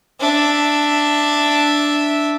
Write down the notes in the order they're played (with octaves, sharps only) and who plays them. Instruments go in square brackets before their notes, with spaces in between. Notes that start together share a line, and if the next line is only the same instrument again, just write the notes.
[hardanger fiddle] D4 E5